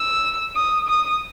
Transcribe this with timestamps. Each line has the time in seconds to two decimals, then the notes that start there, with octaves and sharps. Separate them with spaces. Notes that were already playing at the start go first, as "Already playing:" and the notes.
Already playing: E6
0.56 D#6
0.88 D#6